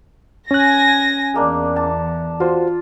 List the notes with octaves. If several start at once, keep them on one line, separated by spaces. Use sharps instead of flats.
C#4 G#5 F#6 A#6
E2 G#3 A#3 D4
A5
F4 F#4 C5